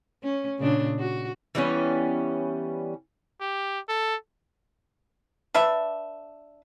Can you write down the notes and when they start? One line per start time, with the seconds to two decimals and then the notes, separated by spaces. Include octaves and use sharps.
0.23 C#4
0.58 A#2 C#3 D4
0.99 F#4
1.55 E3 G3 B3 C#4
3.41 G4
3.89 A4
5.54 D4 B4 E5